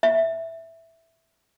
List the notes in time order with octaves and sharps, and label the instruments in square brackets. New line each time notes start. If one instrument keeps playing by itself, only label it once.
[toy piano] E5